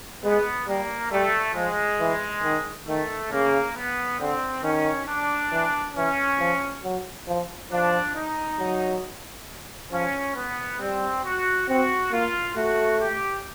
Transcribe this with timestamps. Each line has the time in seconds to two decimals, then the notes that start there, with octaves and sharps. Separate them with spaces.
0.23 G#3 B3
0.67 G3 A#3
1.11 G3 A3
1.55 F3 G#3
2.00 E3
2.43 D#3
2.87 D#3 A3
3.31 C#3 A#3
3.76 B3
4.20 D3 C4
4.63 D#3 C#4
5.07 D4
5.52 E3
5.95 E3 C#4
6.39 F3
6.83 F#3
7.27 F3
7.71 F3 D4
8.15 D#4
8.59 F#3
9.92 F3 C#4
10.36 B3
10.80 G3 C4
11.24 F#4
11.68 C4 F#4
12.12 A#3 F4
12.55 A3 F#4
13.00 G4